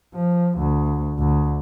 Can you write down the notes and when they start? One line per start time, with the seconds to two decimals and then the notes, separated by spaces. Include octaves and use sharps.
0.15 F3
0.59 D2
1.19 D2